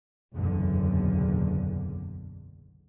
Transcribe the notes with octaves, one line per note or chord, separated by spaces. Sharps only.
F#1 B1 E2 A#2 D3